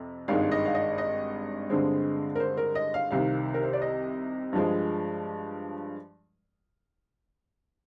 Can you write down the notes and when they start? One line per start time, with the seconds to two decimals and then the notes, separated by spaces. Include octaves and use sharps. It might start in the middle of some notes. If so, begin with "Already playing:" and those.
Already playing: F2 C3
0.28 G#1 G2 D#3 G#3 F5
0.52 D#5
0.66 F5
0.75 D#5
0.98 D#5
1.70 G2 D3 G#3 C4
2.35 A#4
2.40 C5
2.57 A#4
2.75 D#5
2.94 F5
3.11 C2 C3 D#3 F5
3.54 A#4
3.63 C5
3.73 D5
3.82 D#5
4.53 G2 F3 G#3